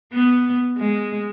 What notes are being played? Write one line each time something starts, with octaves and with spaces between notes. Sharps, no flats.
B3
G#3